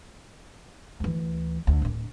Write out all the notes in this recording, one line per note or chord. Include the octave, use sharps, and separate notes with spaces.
D2 E3
D2
D1 D4